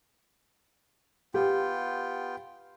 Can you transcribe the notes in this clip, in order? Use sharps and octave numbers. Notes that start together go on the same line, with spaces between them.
B3 F4 G4 G5